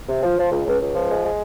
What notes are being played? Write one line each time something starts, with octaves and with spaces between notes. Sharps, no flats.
C3
F3
F3
C#2
C#2
C#2
F3
G#3
G#3